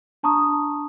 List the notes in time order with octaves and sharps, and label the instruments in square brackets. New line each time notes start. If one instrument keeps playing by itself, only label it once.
[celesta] D4 A5 A#5 C#6 D#6